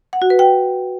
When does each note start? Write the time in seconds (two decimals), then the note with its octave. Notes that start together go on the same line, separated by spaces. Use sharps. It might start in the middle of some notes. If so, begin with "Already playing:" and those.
0.13 F#5
0.22 F#4
0.30 B4
0.39 G5